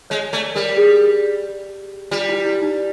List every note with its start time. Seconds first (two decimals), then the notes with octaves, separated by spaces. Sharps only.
0.10 G#3 C#5
0.33 A3 D5
0.55 G3 A#4
0.77 G#4
2.11 G3 F4
2.29 E4
2.45 E4
2.62 D#4